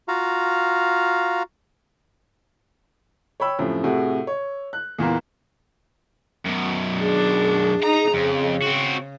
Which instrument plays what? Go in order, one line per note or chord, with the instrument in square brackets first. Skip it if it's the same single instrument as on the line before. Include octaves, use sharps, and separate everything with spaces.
[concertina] F4 F#4 F5 A#5
[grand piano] C#5 G5 B5 E6
F#2 A2 C3 F3
A2 C3 F#4 G#4
C#5
F#6
E2 A#2 E3 A#3
[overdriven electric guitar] F#2 B2
[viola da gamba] D4 [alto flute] G#4
[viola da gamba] D#4 [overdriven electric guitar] A#5
[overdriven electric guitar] F2 [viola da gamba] C#3
[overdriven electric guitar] C4 F#4